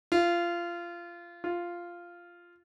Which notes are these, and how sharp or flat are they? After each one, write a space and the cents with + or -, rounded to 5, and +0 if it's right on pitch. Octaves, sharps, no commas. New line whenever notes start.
F4 -20
F4 -5